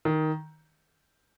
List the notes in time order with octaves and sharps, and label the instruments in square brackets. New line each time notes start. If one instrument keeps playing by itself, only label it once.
[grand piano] D#3